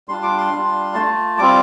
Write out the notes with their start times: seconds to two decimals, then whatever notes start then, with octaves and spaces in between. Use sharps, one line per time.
0.09 G3 D4 F4 C6
0.23 D6
0.37 C6
0.52 G3 D4 F4
0.95 A3 F4 A5
1.38 G3 C4 F4 D6